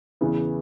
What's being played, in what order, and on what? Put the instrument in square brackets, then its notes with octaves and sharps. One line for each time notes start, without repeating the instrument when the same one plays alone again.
[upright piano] E2 C#3 E3 B3